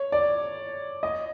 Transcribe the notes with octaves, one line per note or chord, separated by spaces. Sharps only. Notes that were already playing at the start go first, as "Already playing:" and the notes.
Already playing: C#5
D5
D#5